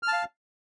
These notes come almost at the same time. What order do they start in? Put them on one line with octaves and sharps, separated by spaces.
F6 A5 F5